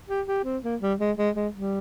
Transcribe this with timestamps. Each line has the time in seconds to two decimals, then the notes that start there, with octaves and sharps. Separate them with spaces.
0.09 G4
0.27 G4
0.45 C4
0.64 A#3
0.81 G3
0.99 G#3
1.18 G#3
1.35 G#3
1.54 G3